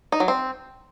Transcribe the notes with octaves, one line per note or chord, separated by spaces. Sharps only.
D#4
F#3
C4